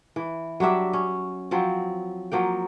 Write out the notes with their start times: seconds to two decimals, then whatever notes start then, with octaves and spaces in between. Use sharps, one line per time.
0.16 E3
0.60 F#3 G3 D4 E5
0.93 C#4
1.51 F3 F#3 C4
2.32 F3 F#3 A#3 G5